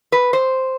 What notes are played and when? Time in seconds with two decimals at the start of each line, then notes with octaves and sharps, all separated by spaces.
0.12 B4
0.33 C5